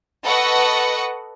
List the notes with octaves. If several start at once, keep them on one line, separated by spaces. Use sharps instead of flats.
A4 B4 D#5 F#5 C#6